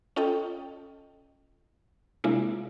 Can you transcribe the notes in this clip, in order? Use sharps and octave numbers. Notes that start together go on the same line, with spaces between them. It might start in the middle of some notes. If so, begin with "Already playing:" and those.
C#4 F4 A4 D#5 G5
C3 G#3 A#3 D4 E4 F4